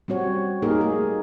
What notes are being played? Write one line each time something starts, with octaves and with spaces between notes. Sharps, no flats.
G3 C4 F#4 C#5
A#3 D#4 G4 G#4 A#4
A3 G#4